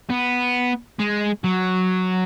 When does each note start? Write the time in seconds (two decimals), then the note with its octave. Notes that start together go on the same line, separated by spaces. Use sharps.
0.10 B3
0.99 G#3
1.44 F#3